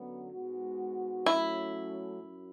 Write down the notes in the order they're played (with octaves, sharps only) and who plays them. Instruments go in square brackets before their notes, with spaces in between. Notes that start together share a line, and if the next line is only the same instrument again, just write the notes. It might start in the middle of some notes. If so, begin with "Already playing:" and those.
Already playing: [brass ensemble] F#2 D3 F#3 B3
G#2 G#3 B3 F#4
[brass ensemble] F#3 A3 C#4 [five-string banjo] E4
[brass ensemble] F#2